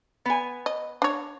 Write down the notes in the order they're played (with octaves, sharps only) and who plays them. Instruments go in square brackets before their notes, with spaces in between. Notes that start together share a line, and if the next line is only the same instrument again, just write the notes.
[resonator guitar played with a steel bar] B3 G#5
[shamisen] D#5
D4 C#5